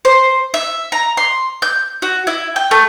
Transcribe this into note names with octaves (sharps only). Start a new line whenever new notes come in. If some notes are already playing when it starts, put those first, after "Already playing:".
C5
E5
A#5
C6
G6
F#4
E4
G5
A3